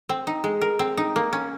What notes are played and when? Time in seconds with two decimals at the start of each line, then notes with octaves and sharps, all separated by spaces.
0.09 C4
0.27 D#4
0.44 G#3
0.61 A#4
0.79 C4
0.97 D#4
1.16 A#3
1.33 C#4